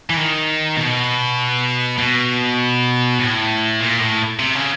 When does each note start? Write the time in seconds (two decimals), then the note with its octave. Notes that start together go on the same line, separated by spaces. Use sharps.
0.10 E3
0.17 D#3
0.77 B2
1.99 B2
3.19 A2
3.80 A#2
3.99 A2
4.40 C3
4.55 C#3